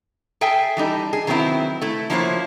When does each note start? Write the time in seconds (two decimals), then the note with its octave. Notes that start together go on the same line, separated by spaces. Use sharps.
0.41 G#4 A4 E5 G5 G#5
0.77 E3 G3 D#4 A4
1.13 G#4
1.27 D#3 F#3 B3 C4 E4
1.81 A3 E4
2.10 F3 A#3 E4 F#4 C5 C#5